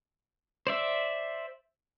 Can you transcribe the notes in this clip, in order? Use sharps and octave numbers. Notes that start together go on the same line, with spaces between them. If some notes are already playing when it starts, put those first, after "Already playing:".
C5 D5 E5